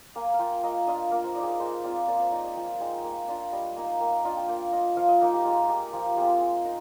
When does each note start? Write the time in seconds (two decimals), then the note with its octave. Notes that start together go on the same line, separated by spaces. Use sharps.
0.15 A#3 G#5
0.34 F5
0.39 F4 G5
0.63 A#3 D#5
0.87 D4 F4 D#5
1.11 A#3 A#4
1.24 C5
1.35 D#4 D5
1.43 G#4
1.48 A#4
1.60 G#3 C5
1.83 C4 F4 D5
2.08 A#3 D5
2.20 C5
2.32 D#4 D#5
2.44 D5
2.56 F3 G5
2.80 G#3 D#4 G5
3.04 A#3
3.28 D4 F4
3.52 G3 D#5
3.76 A#3 D#4 G#5
4.00 A#3 G5
4.12 F5
4.24 D4 F4 D#5
4.37 G5
4.48 A#3 G5
4.72 F4 D#5
4.97 F3 F5
5.08 D#5
5.21 A#3 D#4 A#4
5.33 G4
5.45 G#3 F4
5.69 D#4 G4
5.93 F3 G4
6.17 G#3 C4 F4 G4
6.41 G#3 G#4
6.65 D#4 A#4